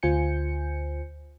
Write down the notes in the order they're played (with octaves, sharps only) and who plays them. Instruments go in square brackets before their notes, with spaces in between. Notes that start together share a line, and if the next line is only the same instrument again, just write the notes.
[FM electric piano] D2 F4 C5 G#5 G6 C#7